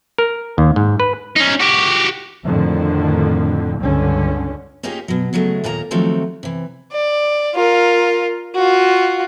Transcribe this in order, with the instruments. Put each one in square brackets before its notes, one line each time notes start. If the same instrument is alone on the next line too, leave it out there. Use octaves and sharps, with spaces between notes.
[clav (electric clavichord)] A#4
D#2
G#2
B4
[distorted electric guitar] C#4 D#4
F#4 G4
[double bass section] F2 A2 D3 D#3 F3
C#2 G2 D3 C#4
[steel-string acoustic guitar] A#3 C#4 D#4 F4 G4 G#4
B2 F#3
C#3 F#3 G#3 A3
D#2 A#2 A#3 A#4 A5 A#5
D#3 F3 F#3 A3 C4 G4
C3 E3
[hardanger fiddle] D5
F4 A#4
F4 F#4